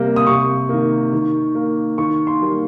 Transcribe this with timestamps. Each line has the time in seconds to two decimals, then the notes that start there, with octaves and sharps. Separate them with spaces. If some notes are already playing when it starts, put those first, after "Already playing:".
Already playing: C3 G3 A#3
0.16 D#6
0.27 C3 C#6
0.69 D#3 A#3
1.13 D#3
1.55 A#3
1.98 D#3 C#6
2.27 C6
2.42 G3 A#3